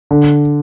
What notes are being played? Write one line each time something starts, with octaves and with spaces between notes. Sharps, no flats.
D3